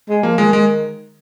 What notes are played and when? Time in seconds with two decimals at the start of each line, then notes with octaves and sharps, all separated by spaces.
0.09 G#3
0.23 F3 A#3
0.38 D#3 G#3
0.53 G#3